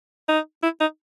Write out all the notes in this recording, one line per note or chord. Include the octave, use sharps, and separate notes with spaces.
D#4
E4
D#4